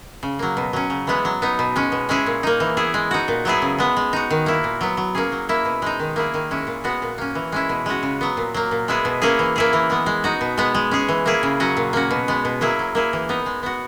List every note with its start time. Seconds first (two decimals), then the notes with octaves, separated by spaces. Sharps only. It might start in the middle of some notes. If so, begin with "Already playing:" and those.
0.23 C#3
0.39 F#3 A#3
0.57 B2
0.73 F#3 C#4
0.90 C#3
1.07 E3 G#3 B3
1.25 F#3
1.42 B3 D#4
1.59 B2
1.76 G#3 C#4
1.92 B2
2.09 G#3 C#4 E4 G#4
2.26 A#2
2.43 A#3 D#4
2.60 E3
2.77 B3 E4 G#4
2.94 G#3
3.11 D#4 F#4
3.28 A#2
3.45 F#3 B3 E4 G#4
3.62 C#3
3.79 G#3 B3
3.97 G#3
4.13 D#4 F#4
4.30 D#3
4.46 A#3 E4
4.64 A#2
4.81 F#3 B3
4.97 F#3
5.15 A#3 C#4 G#4
5.32 F#3
5.49 A#3 E4
5.65 B2
5.82 G#3 D#4
6.00 D#3
6.16 A#3 E4 G#4
6.34 D#3
6.51 G#3 C#4 E4
6.67 A#2
6.84 G#3 B3 F#4
7.02 A#2
7.18 A#3 C#4
7.35 E3
7.52 G#3 C#4 E4
7.69 B2
7.86 G#3 C#4 F#4
8.03 C#3
8.21 F#3 B3
8.37 A#2
8.54 F#3 A#3
8.71 A#2
8.88 G#3 B3 E4 G#4
9.05 B2
9.22 A#3 C#4 E4 G#4
9.39 E3
9.56 A#3 E4 G#4
9.73 E3
9.90 G#3 B3
10.06 G#3
10.24 D#4 F#4
10.41 B2
10.58 G#3 B3
10.74 G#3
10.91 C#4 G#4
11.09 E3
11.26 A#3 E4 G#4
11.43 C#3
11.60 F#3 C#4 F#4
11.77 A#2
11.93 A#3 C#4 F#4
12.11 B2
12.28 G#3 B3
12.45 B2
12.61 F#3 A#3 E4 G#4
12.79 F#3
12.95 A#3 E4 G#4
13.13 E3
13.29 B3 D#4
13.46 G#3
13.63 B3 F#4